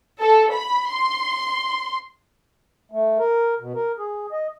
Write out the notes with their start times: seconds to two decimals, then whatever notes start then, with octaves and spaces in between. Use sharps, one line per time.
0.20 A4
0.51 B5
0.93 C6
2.92 A3
3.19 A#4
3.59 B2
3.75 A#4
3.98 G#4
4.32 D#5